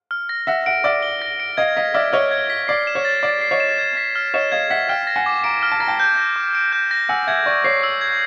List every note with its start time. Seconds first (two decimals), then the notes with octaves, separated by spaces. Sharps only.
0.11 F6
0.29 A#6
0.47 E5 F#5 A#6
0.66 E5 F#5 D7
0.84 D5 E5 F6
1.03 G7
1.22 A#6
1.40 D7
1.57 D#5 F5 G#6
1.76 D#5 F5 B6
1.94 D5 E5 F6
2.13 C#5 D#5 F6
2.31 G#6
2.50 B6
2.68 D5 C7
2.87 E7
2.95 C#5
3.05 A6
3.23 D5 A6
3.41 C7
3.51 C#5 D#5
3.60 E7
3.78 G#6
3.97 B6
4.15 F6
4.34 C#5 D#5 E7
4.52 D#5 F5 G#6
4.70 E5 F#5 B6
4.89 F5 G5 F6
5.07 A#6
5.16 F#5 G#5
5.26 D6
5.44 G#5 A#5 D7
5.63 F6
5.72 A5
5.80 A#5 A#6
5.87 G5 A5
5.99 G6
6.17 A#6
6.36 D6
6.55 D7
6.73 G6
6.91 A#6
7.09 F#5 G#5 E6
7.27 E5 F#5 G#6
7.46 D5 C#6
7.64 C#5 C7
7.83 E6
8.01 G#6